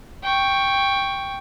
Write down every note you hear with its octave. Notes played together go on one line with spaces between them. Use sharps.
G5 C#6